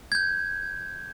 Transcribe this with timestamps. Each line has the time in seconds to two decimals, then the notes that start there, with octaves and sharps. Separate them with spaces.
0.12 G6 G#6